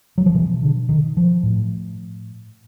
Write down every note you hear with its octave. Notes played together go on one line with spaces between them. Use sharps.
F#3
F3
B2 E3
D3
D#3
F3
A2